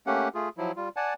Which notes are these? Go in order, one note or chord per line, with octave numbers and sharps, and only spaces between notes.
A3 A#3 C#4 G4 F#5
A3 F4 G#4
F3 F#3 E4
G3 F4
D5 F#5 G#5 A5